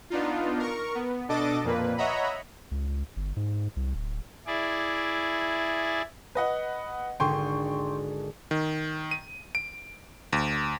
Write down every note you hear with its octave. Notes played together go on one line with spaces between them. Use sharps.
B3 D4 D#4 F4
A#4 C#6
B3
B2 D4 A4 D#5 D6 A6
F2 A#2 A#3 B4
C#5 D#5 E5 F#5 A#5 B5
C#2
G1
G#2
C2
D1
E4 G#4 D5
B4 D#5 F#5
G#1 D3 G5 C6 C#6 D#7
D#3
D#7
D7
D2